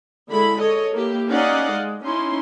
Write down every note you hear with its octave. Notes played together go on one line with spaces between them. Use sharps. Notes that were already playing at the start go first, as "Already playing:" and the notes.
D3 G#3 E4 A4 B5
A4 C#5 D#5
A#3 E4 G4
C#4 D#4 D5 D#5 F5 F#5
G#3
C#4 D#4 E4 C6